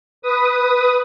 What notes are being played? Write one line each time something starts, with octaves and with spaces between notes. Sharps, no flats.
B4 D#6